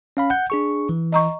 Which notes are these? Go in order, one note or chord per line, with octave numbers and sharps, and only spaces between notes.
C#4 F5 B5
F#5 G6
D4 G#4 C#6
E3
D#5 A#5 C#6